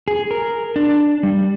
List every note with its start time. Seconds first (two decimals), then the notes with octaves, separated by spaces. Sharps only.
0.08 G#4
0.31 A#4
0.76 D4
1.23 G3